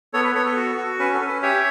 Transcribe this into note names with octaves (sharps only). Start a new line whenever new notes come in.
B3 A4 C#5
B4
B3 A4 C#5
A4
F#4
F#4
C#4 B4
A4
C#4
B4
G4 C#5 E5